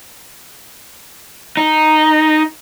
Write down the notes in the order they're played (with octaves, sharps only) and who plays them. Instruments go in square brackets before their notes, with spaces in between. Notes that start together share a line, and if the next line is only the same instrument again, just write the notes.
[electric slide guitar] D#4